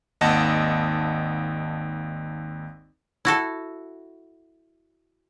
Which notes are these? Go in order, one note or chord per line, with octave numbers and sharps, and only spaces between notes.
G#1 D#2 D#5 F#5 A5 A#6
E4 F#4 A4